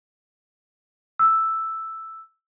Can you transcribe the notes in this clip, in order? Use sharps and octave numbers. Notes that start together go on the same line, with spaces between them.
E6